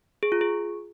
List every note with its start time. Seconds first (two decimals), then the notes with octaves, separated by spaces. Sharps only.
0.23 G#4
0.32 F4
0.41 G#4